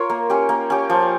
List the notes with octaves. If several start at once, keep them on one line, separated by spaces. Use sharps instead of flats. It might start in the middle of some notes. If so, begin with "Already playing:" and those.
Already playing: F4 A#4 C#5
A#3
C#4 G4
A#3
C#4 G4
F3